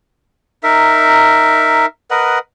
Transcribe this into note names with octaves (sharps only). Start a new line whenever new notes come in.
D#4 A#4 E5
A#4 B4 D#5 F#5